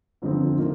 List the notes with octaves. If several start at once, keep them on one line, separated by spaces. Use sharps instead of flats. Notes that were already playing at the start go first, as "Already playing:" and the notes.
G1 F2 D3 F3 C4
C3 D#3 A#3